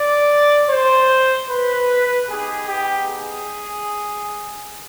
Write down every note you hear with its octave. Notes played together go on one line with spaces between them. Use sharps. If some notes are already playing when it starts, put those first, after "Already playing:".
Already playing: D5
C5
B4
B3 D#4 G4 G#4
G4
G#4